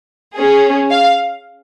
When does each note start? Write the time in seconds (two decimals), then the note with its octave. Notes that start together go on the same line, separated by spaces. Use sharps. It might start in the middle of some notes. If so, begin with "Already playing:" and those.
0.34 C#4 G#4
0.90 F5